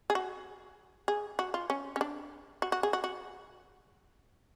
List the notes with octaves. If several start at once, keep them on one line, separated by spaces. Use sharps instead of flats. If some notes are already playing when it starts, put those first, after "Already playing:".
G#4
F#4
G#4
F#4
F4
C#4
C#4
D4
F#4
F#4
G#4
F#4
F#4